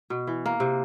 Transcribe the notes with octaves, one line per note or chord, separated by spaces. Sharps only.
B2
E3
A#3
C3